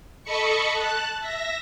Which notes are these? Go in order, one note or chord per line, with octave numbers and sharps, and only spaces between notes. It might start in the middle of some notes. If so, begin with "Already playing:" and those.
A4 D#5 A5 B5 C#6 C#7
A5 F#6
E5 A#6